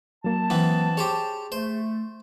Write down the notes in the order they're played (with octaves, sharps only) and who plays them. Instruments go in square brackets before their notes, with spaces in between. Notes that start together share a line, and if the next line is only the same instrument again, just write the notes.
[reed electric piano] F#3 A#3 [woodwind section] A5
[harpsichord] E3 B3 C4
[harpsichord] G4 C5 C#5 [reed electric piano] G#4
[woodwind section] A3 [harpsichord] C5